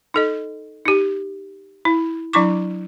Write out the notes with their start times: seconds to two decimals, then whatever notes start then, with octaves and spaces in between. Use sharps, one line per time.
0.14 D#4 A4 D#5
0.85 D#4 G4
1.85 E4
2.33 F#3 D4 E4 C#6 D6